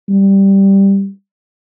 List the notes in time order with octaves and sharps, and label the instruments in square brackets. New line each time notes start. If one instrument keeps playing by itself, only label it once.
[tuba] G3